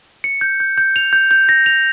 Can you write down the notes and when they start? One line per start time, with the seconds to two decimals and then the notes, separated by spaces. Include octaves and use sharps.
0.24 C#7
0.41 G6
0.60 G6
0.78 G6
0.96 F7
1.13 G6
1.31 G6
1.49 A#6
1.66 F7